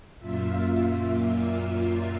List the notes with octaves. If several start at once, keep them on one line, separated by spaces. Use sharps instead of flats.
F#2 A#2 A#3 F4 E5